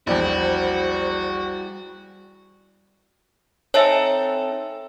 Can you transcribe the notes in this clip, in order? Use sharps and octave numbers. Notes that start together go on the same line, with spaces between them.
A#1 E2 G3 E4 F#4 C5
C4 D#4 A4 C#5 E5 G#5